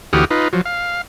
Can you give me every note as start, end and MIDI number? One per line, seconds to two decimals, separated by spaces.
0.13 0.25 38
0.13 0.25 52
0.13 0.25 66
0.13 0.25 67
0.13 0.25 87
0.13 0.25 89
0.31 0.48 63
0.31 0.48 65
0.31 0.48 71
0.53 0.61 53
0.53 0.61 54
0.65 1.02 77